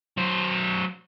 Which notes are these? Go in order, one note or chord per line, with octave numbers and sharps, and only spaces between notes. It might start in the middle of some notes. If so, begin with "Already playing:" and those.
F#3 C5